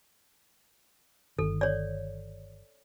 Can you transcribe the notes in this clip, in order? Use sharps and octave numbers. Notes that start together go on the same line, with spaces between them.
G1 D#3 A4
C#5 D5